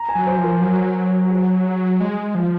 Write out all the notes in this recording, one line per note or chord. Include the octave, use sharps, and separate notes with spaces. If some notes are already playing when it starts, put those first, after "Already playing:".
Already playing: A#5
G#5
F#3
C5
F3
A#4
F#3
G#4
G#3
F3